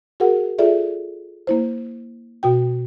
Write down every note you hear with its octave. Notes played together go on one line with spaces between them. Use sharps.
F#4 G#4 A#4 F#5
F4 G#4 A4 D5 E5
A#3 E4 C5
B2 F#4 G5